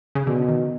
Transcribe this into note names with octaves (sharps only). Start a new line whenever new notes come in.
C#3
B2 D3
D#3